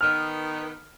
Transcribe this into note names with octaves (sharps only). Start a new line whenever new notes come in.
D#3 B3 F6